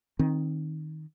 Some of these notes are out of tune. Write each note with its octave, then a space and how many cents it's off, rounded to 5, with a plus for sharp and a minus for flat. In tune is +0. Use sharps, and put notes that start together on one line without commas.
D#3 +0 C4 +30